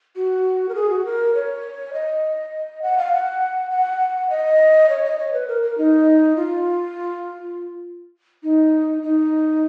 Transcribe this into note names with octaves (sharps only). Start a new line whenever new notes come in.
F#4
A#4
G#4
F#4
A#4
C#5
D#5
F#5
F5
F#5
F#5
D#5
C#5
D#5
C#5
B4
A#4
A#4
D#4
F4
D#4
D#4